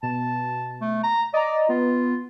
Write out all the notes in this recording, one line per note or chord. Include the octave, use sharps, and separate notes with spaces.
B2 A5
A3
A#5
D5 D#5 A#5
B3 F4